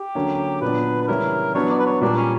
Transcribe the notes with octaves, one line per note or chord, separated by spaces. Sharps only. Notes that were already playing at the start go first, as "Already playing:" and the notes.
Already playing: G4
D3 F#3 A#3 C#4
A#2 F#3 B3 D4 B4
B4
C#3 E3 G3 C#4 E4 A#4
F#3 B3 D4 C#5
D5
B4
C#5
A#2 G3 A#3 D4
C#4